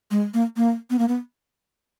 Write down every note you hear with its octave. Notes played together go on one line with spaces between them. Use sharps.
G#3
A#3
A#3
B3
A#3
B3